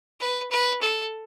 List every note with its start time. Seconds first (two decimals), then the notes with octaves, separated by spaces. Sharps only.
0.20 B4
0.51 B4
0.82 A4